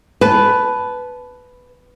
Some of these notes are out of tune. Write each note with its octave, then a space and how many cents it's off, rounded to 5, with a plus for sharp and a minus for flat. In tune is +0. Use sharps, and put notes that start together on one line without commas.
B4 +5 A5 -20